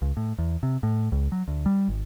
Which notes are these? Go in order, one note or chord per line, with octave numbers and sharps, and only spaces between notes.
C#2
A2
E2
C3
A2
C#2
F#3
D2
G3
G#1